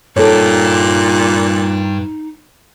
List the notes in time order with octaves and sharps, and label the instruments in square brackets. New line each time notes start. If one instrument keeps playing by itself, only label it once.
[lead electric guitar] G2 G4 [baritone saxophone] A#2 [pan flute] D#4 [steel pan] A4 C#5